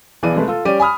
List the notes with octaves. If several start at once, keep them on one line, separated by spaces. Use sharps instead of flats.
B1 E3 G#4 D5 D#7
C3 G#3 A3 B4
F4 A4
G3 C#4 G4 D5 D#7
G#5 B5 D#6 F6